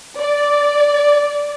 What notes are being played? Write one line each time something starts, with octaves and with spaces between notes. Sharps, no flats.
D5